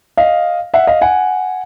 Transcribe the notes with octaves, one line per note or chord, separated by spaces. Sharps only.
D#5 F5
E5 F#5
D#5 F5
F#5 G#5